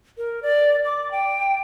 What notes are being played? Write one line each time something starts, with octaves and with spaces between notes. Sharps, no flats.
A#4
D5
D6
G5